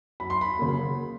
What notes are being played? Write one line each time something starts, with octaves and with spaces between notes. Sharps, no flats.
F#2 B5
C6
B5
C#3 F#3 A#3